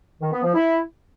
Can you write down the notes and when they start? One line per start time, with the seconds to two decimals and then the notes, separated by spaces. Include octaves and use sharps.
0.21 D#3
0.32 B3
0.43 F3
0.54 E4